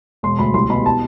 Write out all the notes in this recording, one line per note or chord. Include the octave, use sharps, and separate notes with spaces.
E1 C6
D2 B5
C2 C6
B2 B5
A5